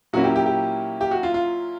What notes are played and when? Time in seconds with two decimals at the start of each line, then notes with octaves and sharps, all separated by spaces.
0.13 A#2 F#3 A#3 C#4 E4 F#4
0.24 G4
0.36 G4
0.46 G4
1.01 G4
1.11 F#4
1.23 F4
1.34 F4